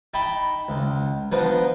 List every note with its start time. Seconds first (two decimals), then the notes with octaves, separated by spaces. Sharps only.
0.14 D#4 G5 A5 B5
0.69 C#2
1.32 F3 B3 D4 D#4